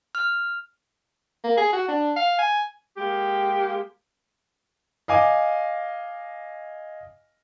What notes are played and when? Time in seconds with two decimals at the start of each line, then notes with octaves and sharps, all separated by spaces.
0.15 F6
1.44 A#3
1.57 G#4
1.73 F#4
1.88 D4
2.16 F5
2.38 G#5
2.97 G#3 A#3 G4
5.08 D#5 F5 G#5 D6 D#7